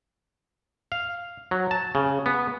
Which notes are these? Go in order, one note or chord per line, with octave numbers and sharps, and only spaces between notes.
F5
F#3
A5
C#3
B3